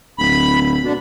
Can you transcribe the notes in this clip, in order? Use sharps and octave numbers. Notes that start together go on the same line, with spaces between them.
D1 B5
B2 D3